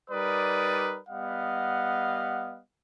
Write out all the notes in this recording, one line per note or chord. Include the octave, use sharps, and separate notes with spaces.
G3 D#4 A#4 B4 D5 D#6
G3 B3 D#5 F5 F#5